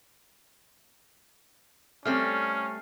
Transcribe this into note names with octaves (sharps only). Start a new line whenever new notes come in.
G3 A3 C4 C#4 F6 C7